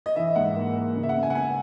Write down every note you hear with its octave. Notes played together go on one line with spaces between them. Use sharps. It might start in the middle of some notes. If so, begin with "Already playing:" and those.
D#5
E3 E5
G#2 F#5
A#3
A#3
C#3
E5
F#5
B3
G#5
F#5
B3 G#5